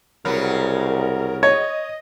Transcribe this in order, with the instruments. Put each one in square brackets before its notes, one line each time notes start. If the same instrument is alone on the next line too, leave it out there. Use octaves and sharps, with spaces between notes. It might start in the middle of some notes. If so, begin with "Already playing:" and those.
[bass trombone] C2 [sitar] C#3 F#3 B3 [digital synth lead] A#4
[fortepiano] C#5 [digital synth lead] D#5